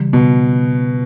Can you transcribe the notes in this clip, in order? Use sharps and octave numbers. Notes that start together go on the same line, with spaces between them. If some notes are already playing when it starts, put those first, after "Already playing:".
Already playing: C#3 E3 G3
B2